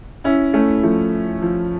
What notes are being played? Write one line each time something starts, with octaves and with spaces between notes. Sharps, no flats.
C#4 E4
A3 C#4
F3 A3
F3